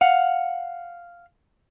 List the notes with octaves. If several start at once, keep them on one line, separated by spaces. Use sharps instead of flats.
F5 F#5